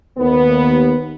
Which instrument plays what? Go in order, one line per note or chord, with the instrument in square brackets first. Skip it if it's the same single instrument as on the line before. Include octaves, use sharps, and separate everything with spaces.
[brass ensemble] D#2 B3